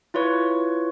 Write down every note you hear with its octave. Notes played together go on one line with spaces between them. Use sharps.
E4 F4 B4 C#5 C#6